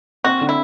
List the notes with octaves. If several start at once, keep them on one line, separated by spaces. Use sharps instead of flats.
C4 F#4
D3
E4